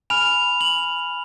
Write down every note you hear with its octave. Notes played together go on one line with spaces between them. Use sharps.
G#5 B5 F6 F7
F#7